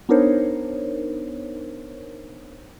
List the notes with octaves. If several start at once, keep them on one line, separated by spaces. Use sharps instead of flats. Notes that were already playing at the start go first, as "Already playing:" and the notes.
B3 D4 D#4 A#4 C5 C#5